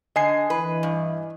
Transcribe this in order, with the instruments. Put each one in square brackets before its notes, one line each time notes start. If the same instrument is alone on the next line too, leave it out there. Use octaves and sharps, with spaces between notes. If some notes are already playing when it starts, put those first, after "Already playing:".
[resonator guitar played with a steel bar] D3 [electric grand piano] D#5 G#5 C7
[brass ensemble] E3 [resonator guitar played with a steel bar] B4
[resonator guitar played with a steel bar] G2